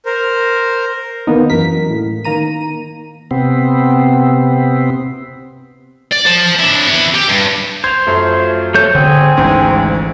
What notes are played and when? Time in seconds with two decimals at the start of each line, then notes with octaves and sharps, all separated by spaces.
0.06 A#4 C5
1.27 D#3 A#3 B3 D#4
1.50 F#2 E3 A#4 B6
1.89 A2
2.24 D#3 A#3 A#5 D#7
3.31 C3 B3 C4
6.12 D5
6.26 C5 A5
6.60 D4 E4
6.88 B3 E4
7.15 G4
7.30 G2
7.84 C5 G#6 F7
8.07 F#2 F3 A3
8.74 A3 C#4 A4 G6
8.95 G#1 D3 C4 G#4
9.37 G#1 D2 G#2 E3 C#4